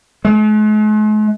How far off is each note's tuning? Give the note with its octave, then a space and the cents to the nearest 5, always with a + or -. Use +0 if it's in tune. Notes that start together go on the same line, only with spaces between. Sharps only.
G#3 +45